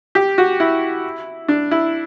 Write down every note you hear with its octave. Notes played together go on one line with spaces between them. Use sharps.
G4
F#4
E4
D4
E4